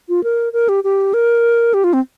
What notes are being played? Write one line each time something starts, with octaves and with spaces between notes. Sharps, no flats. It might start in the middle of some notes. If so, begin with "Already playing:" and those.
F4
A#4
A#4
G4
G4
A#4
G4
F4
C4